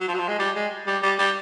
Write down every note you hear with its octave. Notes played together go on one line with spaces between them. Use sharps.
F#3
F3
F#3
F3
G#3
G3
G#3
G3
G3
G3